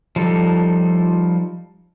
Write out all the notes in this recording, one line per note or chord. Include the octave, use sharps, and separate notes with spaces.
F3 G3 D#4 A4